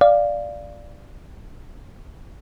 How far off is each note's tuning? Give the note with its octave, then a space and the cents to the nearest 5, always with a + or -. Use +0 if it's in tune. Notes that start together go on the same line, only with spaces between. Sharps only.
D5 +0 F5 -5